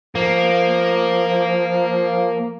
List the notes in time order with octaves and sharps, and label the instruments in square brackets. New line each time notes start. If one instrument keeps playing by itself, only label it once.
[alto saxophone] F3 [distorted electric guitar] A#3